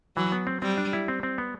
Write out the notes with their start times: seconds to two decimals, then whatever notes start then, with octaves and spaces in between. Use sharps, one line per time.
0.16 E3 F#3
0.32 B3
0.47 C4
0.62 G3 C4
0.78 D4
0.93 E4
1.08 C4
1.23 C4
1.38 B3